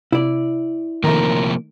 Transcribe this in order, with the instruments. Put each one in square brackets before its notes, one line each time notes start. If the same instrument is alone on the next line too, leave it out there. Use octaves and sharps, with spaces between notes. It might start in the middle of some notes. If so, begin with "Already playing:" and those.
[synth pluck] C3 [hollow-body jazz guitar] E4 D5
[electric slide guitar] C3 F3 A#3 [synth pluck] D#3 A3 [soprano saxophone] A#4